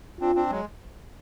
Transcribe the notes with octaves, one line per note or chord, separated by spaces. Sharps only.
C4 D4 F4
C4 D4
F#3 G#3